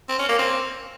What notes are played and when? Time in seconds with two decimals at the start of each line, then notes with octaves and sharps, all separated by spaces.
0.09 C4
0.19 C#4
0.29 A#3
0.39 C4